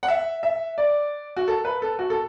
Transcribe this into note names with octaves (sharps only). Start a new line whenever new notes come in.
F#5
E5
E5
D5
F#4
A4
B4
A4
F#4
A4